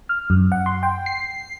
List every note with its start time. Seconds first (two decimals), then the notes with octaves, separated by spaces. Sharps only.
0.09 F6
0.30 F#2
0.52 F#5
0.66 C6
0.83 G5
1.06 C7